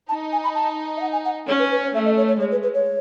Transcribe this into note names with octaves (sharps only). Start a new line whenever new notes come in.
D#4 A5
G#5
B5
A5
E5
F#5
G#5
F#5
C#4 C#5
B4
B4
C#5
A3 E5
D#5
C#5
C#5
G#3 C#5
B4
B4
C#5